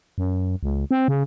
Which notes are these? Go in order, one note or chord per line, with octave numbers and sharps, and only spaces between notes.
F#2
C#2
C4
C#3